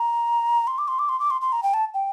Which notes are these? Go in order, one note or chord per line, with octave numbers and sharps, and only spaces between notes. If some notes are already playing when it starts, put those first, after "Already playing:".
Already playing: A#5
C6
D6
C6
D6
C6
D6
C6
C6
A#5
G5
A5
G5